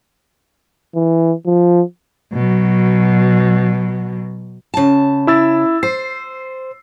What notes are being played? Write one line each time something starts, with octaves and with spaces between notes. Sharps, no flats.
E3
F3
B2 F#3
C#3 A5
E4 E6 A6
C5 C7